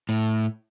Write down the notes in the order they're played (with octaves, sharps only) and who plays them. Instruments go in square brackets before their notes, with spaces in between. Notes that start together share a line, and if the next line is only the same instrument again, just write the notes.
[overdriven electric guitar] A2